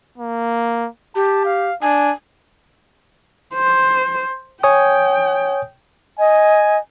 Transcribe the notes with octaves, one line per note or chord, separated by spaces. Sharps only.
A#3
G4 A5
F5
D4 G#5
C5
C#5 G5 G#5 D#6
D#5 G#5